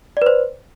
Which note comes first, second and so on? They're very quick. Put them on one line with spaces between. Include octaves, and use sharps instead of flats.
D5 B4 C5